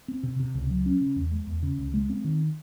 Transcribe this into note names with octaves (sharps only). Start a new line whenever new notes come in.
C4
C3
C3
C#2
F#3
C#4
C#3
E2
G#3
E2
C#3
C#2
G#3
C4
D#3